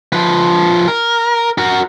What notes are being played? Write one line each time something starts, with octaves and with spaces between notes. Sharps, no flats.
F3 B4
A#4
F#4 A#4